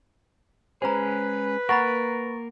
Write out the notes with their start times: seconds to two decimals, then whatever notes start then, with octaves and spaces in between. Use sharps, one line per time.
0.82 G#3 C#4 G#4 B4 C5 A#5
1.69 A#3 A#4 F#5 A#5 B5 C#6 A6